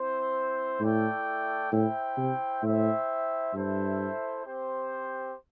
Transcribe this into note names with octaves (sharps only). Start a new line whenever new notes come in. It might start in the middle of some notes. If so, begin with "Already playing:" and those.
Already playing: C4 E4 C5
A2 A3 E4 A4 D5 G5
A2 E4 C5 E5 G5
C3
A2 E4 C5 E5 G5
G2 E4 A4 C5 E5
C4 G4 C5